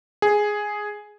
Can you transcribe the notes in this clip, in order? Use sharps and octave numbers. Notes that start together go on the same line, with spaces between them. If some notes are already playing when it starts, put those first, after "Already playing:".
G#4